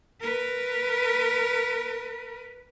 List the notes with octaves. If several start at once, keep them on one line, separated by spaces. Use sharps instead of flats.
A#4 B4